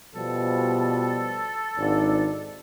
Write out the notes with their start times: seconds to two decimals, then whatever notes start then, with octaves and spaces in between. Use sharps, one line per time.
0.15 B2 F3 G3 A4
1.77 G#1 G#2 D4